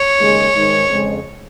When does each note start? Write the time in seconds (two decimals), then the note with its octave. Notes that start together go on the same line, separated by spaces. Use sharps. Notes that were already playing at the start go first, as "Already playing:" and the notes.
Already playing: C#5
0.18 D#2 C#3 G#3
0.53 G#2 D#3 G#3 D#4
0.89 F2 C#3 G#3